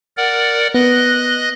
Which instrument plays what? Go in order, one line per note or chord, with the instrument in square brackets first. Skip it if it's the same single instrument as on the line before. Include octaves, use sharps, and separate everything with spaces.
[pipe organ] A#4 D5 F#5
[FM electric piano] B3 [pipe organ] D#5 F#6